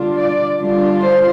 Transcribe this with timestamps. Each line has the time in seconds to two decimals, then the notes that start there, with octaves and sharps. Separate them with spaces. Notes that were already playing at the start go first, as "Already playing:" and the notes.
Already playing: D3 G3 D4 F4
0.18 D5
0.60 D3 G3 D4 F4
1.02 C5